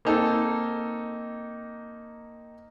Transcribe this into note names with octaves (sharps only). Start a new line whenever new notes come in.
A#3 C4 D#4 A4